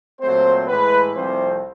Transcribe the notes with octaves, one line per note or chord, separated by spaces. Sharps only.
A#2 F#3 A3 C4 C5
A2 E3 G#3 B4
C2 C3 F3 A3 C4 C5